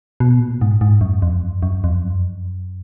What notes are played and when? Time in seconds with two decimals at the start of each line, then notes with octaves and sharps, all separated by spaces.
0.20 B2
0.40 A#2
0.61 G#2
0.81 G#2
1.01 F#2
1.22 F2
1.43 F#2
1.63 F#2
1.84 F2
2.04 F#2